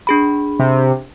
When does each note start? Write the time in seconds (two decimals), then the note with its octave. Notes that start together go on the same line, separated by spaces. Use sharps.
0.07 D4 G#4 B5
0.59 C3